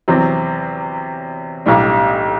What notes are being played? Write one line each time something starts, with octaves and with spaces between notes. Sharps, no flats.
E2 C3 F#3 C4
B1 A2 G3 D4